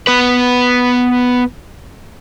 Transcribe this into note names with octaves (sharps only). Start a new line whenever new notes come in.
B3 B4